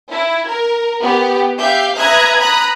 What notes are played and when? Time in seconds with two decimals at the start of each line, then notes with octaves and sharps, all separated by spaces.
0.11 E4
0.48 A#4
1.01 B3 G4
1.58 G4 E5 F5 G6
1.97 B4 E5 A#5 D#6 F#6 G#6
2.38 A#5 B5 D#6 F#6